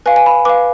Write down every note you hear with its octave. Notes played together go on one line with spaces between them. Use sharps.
B4 F5 G#5
G#5
B5
B4 F5 D6